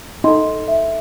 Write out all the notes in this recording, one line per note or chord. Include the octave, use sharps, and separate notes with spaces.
D#4 A4 C6
E5